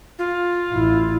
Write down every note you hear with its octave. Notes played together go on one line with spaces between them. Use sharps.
F4
A1 E4